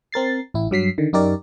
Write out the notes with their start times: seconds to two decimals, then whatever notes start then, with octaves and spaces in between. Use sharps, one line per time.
0.12 C4 A#4 A6 C7
0.54 A1 E4
0.71 G2 F#3 B6 C7
0.98 D3 D#3
1.13 F#2 D#4 G4 A#4 D5